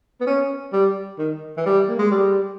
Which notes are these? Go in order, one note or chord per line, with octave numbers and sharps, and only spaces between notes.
B3
C#4
G3
D#3
E3
G3
A#3
G#3
G3